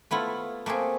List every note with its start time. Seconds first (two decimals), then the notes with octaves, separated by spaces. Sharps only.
0.11 A3 B3 E4 F4
0.66 A3 A#3 C4 G#4